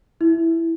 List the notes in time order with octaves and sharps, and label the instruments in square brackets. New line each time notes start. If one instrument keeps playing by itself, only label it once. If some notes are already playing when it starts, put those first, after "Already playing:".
[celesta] E4